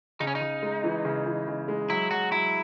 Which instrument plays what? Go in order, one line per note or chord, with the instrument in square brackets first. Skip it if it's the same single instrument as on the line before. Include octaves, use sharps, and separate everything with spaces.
[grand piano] C#3 [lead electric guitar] D#4
[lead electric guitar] C#4
D#4
[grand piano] C#3
G#3
E3
C#3
E3
C#3
G#3
[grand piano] F#3 [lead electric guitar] E4
[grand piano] F#3 [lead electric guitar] F#4
[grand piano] F#3 [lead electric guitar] E4